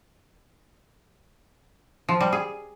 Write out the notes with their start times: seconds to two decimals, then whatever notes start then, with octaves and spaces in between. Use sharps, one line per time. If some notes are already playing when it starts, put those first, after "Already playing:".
2.09 F3
2.21 G3
2.32 G#4